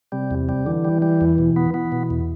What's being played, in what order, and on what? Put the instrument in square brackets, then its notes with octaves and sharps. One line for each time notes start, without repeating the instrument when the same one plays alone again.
[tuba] C3 [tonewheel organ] G3
[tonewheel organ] E2
G3
[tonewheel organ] D3 [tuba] E3
[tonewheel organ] G3
G3
E2
B2
B3
[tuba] E3 [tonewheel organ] B3
[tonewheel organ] B2
E2